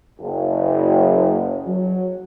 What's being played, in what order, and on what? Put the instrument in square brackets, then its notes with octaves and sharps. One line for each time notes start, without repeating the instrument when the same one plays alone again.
[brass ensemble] F#1
F#3